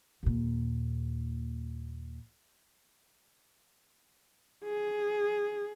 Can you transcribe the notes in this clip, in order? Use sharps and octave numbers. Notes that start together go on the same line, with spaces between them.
D#2 A#2
G#4